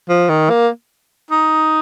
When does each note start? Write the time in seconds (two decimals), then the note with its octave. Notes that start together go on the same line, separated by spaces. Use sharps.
0.09 F3
0.29 D#3
0.50 A#3
1.31 D#4